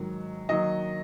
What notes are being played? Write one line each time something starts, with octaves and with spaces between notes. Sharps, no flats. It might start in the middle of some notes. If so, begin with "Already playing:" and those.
Already playing: G#2 D#3 F#3
D#3 F#3 A#3 D#5